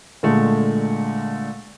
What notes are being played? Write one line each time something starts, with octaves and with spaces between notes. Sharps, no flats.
A#2 D3 G#3 A3